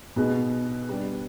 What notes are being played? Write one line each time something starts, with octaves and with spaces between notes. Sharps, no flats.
B2 B3 D#4 G#4 B4
G3 B3 D4